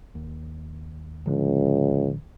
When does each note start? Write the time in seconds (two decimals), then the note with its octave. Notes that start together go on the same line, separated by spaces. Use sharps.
0.15 D#2
1.27 C#2 A2 D3 F3